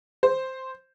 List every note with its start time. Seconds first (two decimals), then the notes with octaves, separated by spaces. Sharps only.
0.23 C5